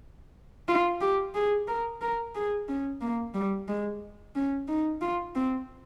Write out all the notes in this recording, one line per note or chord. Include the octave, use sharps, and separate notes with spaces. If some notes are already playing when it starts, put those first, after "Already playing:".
F4
G4
G#4
A#4
A#4
G#4
C#4
A#3
G3
G#3
C#4
D#4
F4
C4